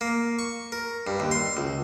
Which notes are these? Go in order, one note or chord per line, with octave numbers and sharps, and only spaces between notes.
A#3
C#6
A#4
G2
D#2
C6
C#2